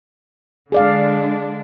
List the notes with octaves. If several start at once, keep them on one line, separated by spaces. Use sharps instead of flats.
D3 G#3 D4 G#4 D5 F5